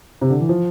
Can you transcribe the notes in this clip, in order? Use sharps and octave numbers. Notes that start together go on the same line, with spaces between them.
C3
D3
E3
F3